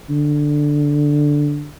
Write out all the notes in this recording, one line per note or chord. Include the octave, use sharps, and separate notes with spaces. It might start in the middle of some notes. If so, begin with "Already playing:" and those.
D3